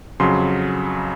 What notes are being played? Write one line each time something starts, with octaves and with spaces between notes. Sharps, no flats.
F2 C#3 F#3 C6